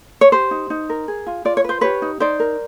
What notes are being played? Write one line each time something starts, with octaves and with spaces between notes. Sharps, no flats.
C#5
G4 C5
D#4
D#4
A#4
G#4
F4
F4 D5
C#5
B4 C5
G4 B4 C#5
D#4
D#4 C5 D5
A#4